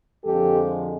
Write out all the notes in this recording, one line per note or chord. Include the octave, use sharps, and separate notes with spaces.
F2 D3 F3 G#3 G4 A4